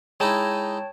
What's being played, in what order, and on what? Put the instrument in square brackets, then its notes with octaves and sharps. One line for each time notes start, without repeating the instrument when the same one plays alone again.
[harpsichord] G#3 D#4 E4 [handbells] C#5 G5 A5